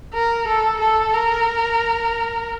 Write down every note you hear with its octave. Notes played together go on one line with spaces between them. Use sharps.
A#4
A4
A4
A#4